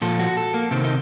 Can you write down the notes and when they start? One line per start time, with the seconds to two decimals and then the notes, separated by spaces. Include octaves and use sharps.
0.02 A#2 F3 A4
0.19 F#4
0.37 A4
0.54 A#3
0.71 C3 D#3 C4
0.84 D#4